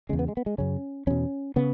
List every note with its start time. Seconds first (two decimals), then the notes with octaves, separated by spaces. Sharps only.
0.09 E2 C#3 G#3
0.19 B3
0.28 G#3
0.37 B3
0.46 G#3
0.58 F#2 C#3 C#4
1.07 E2 B2 C#4
1.56 C#3 B3